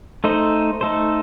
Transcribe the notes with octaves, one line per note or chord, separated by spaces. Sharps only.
A3 D#4 A4 C5
A3 D#4 A4 C5